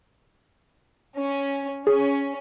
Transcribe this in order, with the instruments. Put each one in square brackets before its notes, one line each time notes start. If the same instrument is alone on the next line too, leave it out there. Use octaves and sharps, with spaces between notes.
[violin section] C#4
[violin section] C#4 [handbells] G#4